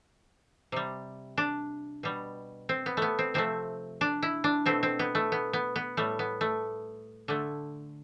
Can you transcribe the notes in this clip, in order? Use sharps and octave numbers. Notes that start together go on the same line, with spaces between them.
C3 G3
D4
B2 G3
C4
B3
A3 B3
C4
C3 F3 A3 C4
D4
E4
D4
B2 A3 C4
C4
B3
A3
B3
B3
B3
A2 G3 A3
B3
A3
D3 A3